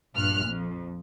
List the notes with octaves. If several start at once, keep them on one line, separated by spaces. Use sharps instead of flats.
A#1 G2 F6 F#6
F2